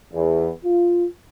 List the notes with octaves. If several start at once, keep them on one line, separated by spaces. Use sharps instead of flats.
E2
F4